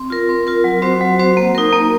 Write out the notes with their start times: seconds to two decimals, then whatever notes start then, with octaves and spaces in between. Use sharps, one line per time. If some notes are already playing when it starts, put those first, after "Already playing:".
Already playing: C4
0.10 F4 A#4
0.29 C4
0.47 F4 A#4
0.64 F#3
0.82 C4 F#4 C5
1.01 F#3
1.19 C4 F#4 C5
1.37 A#3
1.55 D#4 A#4
1.72 A#3